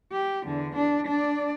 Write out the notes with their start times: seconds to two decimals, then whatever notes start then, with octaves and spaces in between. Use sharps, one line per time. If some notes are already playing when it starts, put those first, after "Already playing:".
0.12 G4
0.44 E2 D3
0.76 D4
1.07 D4 D5